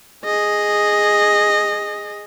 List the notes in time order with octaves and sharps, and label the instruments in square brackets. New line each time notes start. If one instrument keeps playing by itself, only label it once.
[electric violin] G#4 D#5